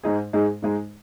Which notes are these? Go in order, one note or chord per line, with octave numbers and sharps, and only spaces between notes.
G#2 G#3 D#4 G#4
G#2 G#3 D#4 G#4
G#2 G#3 D#4 G#4